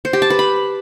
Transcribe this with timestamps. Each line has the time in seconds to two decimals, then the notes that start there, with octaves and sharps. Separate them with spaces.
0.05 C5
0.13 G4
0.22 A5
0.30 B4
0.39 B5